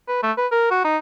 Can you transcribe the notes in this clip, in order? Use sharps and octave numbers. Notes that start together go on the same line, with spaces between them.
B4
A3
B4
A#4
F#4
D#4